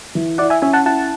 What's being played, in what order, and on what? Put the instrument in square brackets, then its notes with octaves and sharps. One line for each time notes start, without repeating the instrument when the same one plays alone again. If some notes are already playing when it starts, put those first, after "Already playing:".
[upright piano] E3
[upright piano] E4 [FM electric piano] D5 F#5
[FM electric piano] E5 G#5
[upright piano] C#4 [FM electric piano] E5 G#5
[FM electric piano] F#5 A5
[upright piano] E4 [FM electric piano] F#5 A5